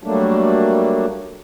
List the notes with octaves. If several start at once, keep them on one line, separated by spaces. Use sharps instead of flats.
F#3 G3 A3 A#3 D4